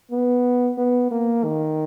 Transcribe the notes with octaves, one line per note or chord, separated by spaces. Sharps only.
B3
B3
A#3
D#3